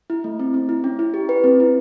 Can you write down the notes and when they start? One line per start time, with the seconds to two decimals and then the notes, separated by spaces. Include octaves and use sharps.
0.10 E4
0.24 A3
0.39 C4
0.54 C4
0.69 E4
0.84 C#4
0.99 E4
1.14 G4
1.29 B4
1.44 C4
1.60 E4